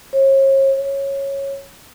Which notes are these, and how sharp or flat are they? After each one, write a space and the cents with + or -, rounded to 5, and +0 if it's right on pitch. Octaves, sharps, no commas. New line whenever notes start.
C#5 -40
C#5 -10